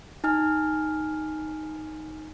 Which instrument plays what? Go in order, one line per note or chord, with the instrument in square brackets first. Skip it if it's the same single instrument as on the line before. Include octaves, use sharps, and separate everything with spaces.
[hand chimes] D#4 G#5 F6